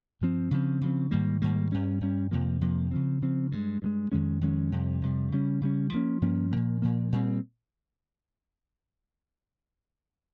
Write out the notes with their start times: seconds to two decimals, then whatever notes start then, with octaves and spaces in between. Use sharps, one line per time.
0.21 G2 F3 C4
0.51 C#3 F3 C4
0.81 C#3 F3 C4
1.11 G#2 D#3 G3 A#3
1.42 G#2 D#3 G3 A#3
1.72 G2 G3 C#4
2.01 G2 G3 C#4
2.31 F2 C3 F3 A#3
2.61 F2 C3 F3 A#3
2.91 C#3 F3 C4
3.22 C#3 F3 C4
3.52 G2 F3 G#3
3.82 G2 F3 G#3
4.12 F2 D#3 G#3 C#4
4.41 F2 D#3 G#3 C#4
4.72 F2 C3 G3
5.02 F2 C3 G3
5.32 C#3 G3 C#4
5.61 C#3 G3 C#4
5.92 G2 F3 A#3 C#4
6.22 G2 F3 A#3 C#4
6.51 A#2 F3 A#3
6.82 A#2 F3 A#3
7.12 A#2 G3 C4